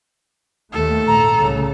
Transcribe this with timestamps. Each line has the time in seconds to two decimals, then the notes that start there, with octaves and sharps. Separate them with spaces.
0.73 D#2 D#3 A3 A4
1.07 A#1 G#2 A#5
1.37 C2 A2 C#3